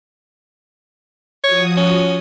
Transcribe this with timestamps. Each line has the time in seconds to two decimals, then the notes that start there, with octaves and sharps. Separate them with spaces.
1.44 F3 F#4 C#5 D#6
1.77 C#4